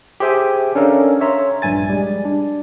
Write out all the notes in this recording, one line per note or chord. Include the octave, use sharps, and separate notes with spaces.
G4 G#4 C5 E5 G5 G#5
C#4 D4 A4 A#4 F5
C#5 E5 A#5 C6
A#1 G2 G#5 A6
G3 G#3
D4